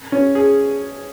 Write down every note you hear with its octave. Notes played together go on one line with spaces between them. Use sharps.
C#4
G#4